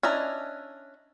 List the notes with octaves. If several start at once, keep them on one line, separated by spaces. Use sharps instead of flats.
C#4 D4 E4 D#5 A#5